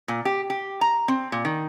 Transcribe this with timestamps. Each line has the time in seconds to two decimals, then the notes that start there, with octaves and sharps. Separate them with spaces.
0.08 A#2
0.25 G4
0.50 G4
0.81 A#5
1.08 C4
1.32 A#2
1.45 D#3